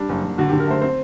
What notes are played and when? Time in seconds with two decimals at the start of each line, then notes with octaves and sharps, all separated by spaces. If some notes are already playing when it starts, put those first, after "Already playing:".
Already playing: G3 D4
0.09 F#1
0.24 F#1
0.38 D3 F#4
0.49 G4
0.53 D3
0.60 A#4
0.68 A3 C5
0.82 C4 C5